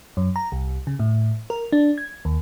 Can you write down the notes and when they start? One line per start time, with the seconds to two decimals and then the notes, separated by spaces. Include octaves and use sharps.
0.17 F#2
0.36 A#5
0.52 C2
0.87 C#3
0.99 A2
1.50 A#4
1.72 D4
1.98 G#6
2.25 D#2